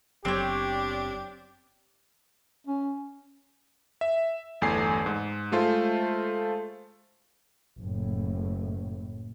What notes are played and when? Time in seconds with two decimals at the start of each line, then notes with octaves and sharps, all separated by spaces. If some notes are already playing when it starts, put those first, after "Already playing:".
0.25 F#1 F#3 B3 C4 D4 G4 C#5
2.67 C#4
4.01 E5
4.61 G1 E2 A3 G#5 C7
5.06 G#2
5.52 G#3 A3 F4 C5
7.80 F#1 A2